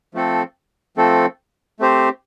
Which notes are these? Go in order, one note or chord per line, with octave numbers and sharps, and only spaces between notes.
F3 A3 C4 A4
F3 A3 C4 A4
A3 C4 G4 C5